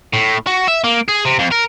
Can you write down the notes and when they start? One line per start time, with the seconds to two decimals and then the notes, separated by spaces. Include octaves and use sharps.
0.13 A2
0.47 F#4
0.68 E5
0.84 A#3
1.08 G#4
1.25 C3
1.39 F2
1.51 A#4